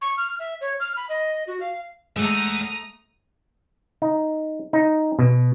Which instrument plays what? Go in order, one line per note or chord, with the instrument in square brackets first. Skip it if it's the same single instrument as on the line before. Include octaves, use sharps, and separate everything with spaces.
[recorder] C#6
F6
E5
C#5
F6
B5
D#5
F#4
F5
[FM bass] G#3 [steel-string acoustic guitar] A3 [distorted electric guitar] E5 F#5 [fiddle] A#5 D#6
[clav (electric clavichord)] D#4
D#4
B2